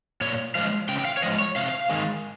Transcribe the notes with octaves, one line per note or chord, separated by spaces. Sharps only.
A#2 C#5
F3 G#3 F5
C#3 G5
G5
F5
C#5
F3 G#3 D#5
C#5
C3 F5
D#3 G#3